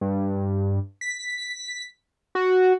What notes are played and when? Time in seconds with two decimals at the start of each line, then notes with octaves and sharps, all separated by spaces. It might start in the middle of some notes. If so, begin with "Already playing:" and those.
0.01 G2
1.01 B6
2.35 F#4